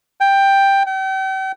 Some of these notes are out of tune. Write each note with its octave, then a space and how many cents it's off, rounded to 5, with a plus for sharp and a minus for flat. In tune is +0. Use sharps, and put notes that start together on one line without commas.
G5 +10
G5 -40